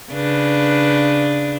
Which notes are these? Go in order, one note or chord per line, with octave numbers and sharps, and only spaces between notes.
C#3 D4 B4